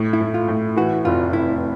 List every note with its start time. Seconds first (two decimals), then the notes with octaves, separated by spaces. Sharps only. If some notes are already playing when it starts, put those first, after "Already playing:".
Already playing: A2
0.13 E4
0.20 A2
0.34 F4
0.48 A2
0.76 E3 F#4
1.05 F1 F4
1.33 F1 E4